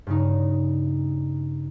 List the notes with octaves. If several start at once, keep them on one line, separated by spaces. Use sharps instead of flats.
G2 C#3 D#4